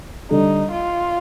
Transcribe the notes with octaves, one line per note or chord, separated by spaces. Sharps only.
D3 G3 D4 D#4 A4
F4